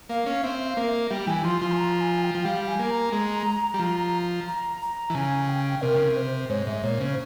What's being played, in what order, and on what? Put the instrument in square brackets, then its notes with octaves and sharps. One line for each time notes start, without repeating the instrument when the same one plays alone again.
[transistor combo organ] A#3 [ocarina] F5
[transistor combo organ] C#4
[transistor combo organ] C4 [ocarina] E5
[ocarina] F5
[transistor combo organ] A#3
[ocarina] E5
[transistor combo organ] G3 [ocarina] G5
[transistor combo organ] E3 [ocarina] G#5
[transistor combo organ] F3 [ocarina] C6
[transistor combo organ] F3 [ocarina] C6
[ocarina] G#5
A#5
G#5
G5
[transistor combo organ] F3
[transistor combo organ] G3 [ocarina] F5
[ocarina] G#5
[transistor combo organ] A#3
[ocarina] A#5
[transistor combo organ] G#3
G3
F3
[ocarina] A#5
A#5
[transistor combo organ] E3
[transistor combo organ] C#3 [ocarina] G#5
[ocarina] G5
[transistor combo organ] C3 [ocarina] A#4
[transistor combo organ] C#3
C3
[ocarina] C5
[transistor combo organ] G#2 [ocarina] C#5
[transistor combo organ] G#2 [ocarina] E5
[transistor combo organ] A#2 [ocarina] C#5
[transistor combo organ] C#3 [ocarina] C5